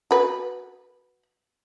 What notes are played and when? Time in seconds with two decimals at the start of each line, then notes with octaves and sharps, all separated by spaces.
0.11 F#4 B4